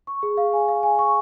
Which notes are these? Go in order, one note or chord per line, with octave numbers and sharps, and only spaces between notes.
C#6
G#4
F5
G#5
F5
G#5
C#6